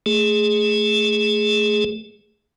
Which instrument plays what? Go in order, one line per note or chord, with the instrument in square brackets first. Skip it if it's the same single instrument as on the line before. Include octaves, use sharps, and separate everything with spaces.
[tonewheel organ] A3 G#4